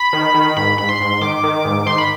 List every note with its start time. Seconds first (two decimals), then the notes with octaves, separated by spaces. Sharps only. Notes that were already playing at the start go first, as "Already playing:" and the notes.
Already playing: B5
0.13 D#3
0.34 D#3
0.57 G#2 B5
0.78 G#2 B5
0.89 C6
1.00 G#2
1.21 D#3 D6
1.43 D#3
1.65 G#2
1.86 D#3 C6
1.98 B5